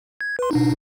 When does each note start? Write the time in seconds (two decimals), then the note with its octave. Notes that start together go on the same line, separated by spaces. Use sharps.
0.21 G#6
0.39 B4 C6
0.51 B2 D4 D#4